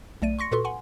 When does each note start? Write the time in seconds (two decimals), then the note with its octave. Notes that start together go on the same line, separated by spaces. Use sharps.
0.22 B1 A3 D5 D#7
0.39 C6 C#6 A#6 C#7
0.52 A#2 F#4 A4 B4 C6 C#6
0.64 F#5 G#5 C6